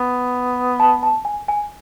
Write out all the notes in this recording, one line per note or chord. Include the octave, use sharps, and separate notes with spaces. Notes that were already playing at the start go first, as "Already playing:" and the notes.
Already playing: B3
A5
A5
G#5
G#5